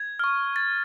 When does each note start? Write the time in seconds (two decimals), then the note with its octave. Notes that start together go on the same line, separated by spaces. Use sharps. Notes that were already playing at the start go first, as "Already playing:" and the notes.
Already playing: G#6
0.19 C#6 F6
0.56 A6